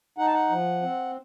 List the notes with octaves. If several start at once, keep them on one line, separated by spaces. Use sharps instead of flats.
D#4 F#5
A5
F#5
F3
C4